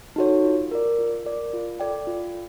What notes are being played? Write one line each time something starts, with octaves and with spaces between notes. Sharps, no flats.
D#4 F#4 A4 C#5
F4
A#4 D5
F4
A#4 D5
F4
A4 D5 G5
F4